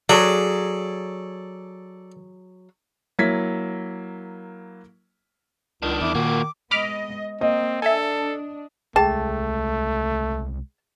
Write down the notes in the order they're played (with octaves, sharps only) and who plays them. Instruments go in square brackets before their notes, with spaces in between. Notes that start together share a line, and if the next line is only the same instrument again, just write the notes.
[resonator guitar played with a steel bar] F#3 G#4 [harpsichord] A4 D5
[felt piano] F#3 A#3 E4 G#6 B6
[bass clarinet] C#2 [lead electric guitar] D#3 D4
[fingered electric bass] E2 [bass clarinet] E4 [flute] D6
[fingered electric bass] A#2 [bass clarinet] D#3 [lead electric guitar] A#3 F#4
[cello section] G#3 B3 D#5 [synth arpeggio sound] B5 D6 F6
[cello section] A#3 [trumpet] C4 [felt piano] D#5
[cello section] D4 [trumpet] A4 [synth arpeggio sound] E5 G#5
[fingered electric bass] C2 G#3 [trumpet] A3 [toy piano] G#4 G5 [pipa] A5